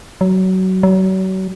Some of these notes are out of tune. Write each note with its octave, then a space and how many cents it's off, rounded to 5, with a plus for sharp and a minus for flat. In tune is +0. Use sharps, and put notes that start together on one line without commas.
F#3 +20
F#3 +35